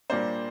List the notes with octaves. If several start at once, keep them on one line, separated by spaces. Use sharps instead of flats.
A#2 G3 A#3 D4 C5